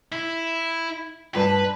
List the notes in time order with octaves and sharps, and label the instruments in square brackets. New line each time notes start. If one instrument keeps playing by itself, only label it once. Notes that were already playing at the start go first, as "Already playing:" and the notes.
[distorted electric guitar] E4
[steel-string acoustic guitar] G2 A5 [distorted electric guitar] B4